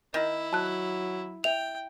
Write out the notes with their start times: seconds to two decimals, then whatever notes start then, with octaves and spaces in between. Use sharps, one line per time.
0.14 D#3 E4
0.53 F#3 A5 F#6
1.44 E5 G5 F7